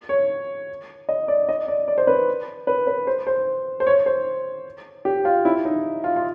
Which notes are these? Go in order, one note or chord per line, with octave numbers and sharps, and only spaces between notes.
C#5
D#5
D5
D#5
D5
D5
C5
B4
B4
B4
C5
C5
C5
C#5
C5
G4
F4
E4
D#4
F4
F4